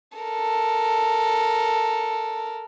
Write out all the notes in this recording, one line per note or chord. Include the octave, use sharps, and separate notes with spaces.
A4 A#4